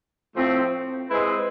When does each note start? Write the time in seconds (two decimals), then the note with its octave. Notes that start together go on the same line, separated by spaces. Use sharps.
0.36 A2 F3 A3 C4
1.10 G#3 C4 E4 B4